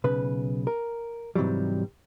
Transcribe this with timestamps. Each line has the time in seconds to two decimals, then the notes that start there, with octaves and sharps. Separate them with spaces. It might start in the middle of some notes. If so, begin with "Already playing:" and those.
0.04 B1 C#3 B4
0.67 A#4
1.36 G#2 C3 E3 F#3 G3